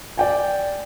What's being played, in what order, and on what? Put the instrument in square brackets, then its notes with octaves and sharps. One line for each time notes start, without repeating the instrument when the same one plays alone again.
[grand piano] D5 G5 G#5